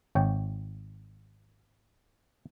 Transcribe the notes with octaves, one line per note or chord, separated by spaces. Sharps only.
G#1 C#5 G5